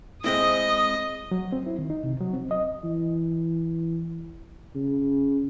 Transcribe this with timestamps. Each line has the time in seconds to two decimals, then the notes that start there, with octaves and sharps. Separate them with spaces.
0.24 G#3 C4 E4 D#5 D#6
1.31 F#3
1.53 C4
1.66 E4
1.79 D#3
1.90 D#4
2.04 C3
2.21 F#3
2.33 C4
2.51 D#5
2.84 E3
4.75 C#3